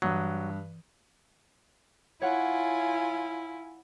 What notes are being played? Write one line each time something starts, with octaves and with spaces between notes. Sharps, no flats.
G2 E3 F#3 D#6
E4 F4 C#5 F#5 G#5